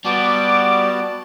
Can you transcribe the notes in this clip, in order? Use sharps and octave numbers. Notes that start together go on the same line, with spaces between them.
G3 B3 F#4 A5 D6